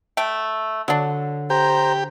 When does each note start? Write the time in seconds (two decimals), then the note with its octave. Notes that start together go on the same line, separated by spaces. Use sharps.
0.17 A3 G5
0.88 D3 F#3 D4
1.50 G4 C5 A#5